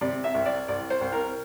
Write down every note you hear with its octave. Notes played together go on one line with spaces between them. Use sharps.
C3 D5
E5
C2
D5
C2 D5
C5
C2
A#4